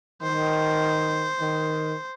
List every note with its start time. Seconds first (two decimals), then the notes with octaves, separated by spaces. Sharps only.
0.22 D#3 C5
1.40 D#3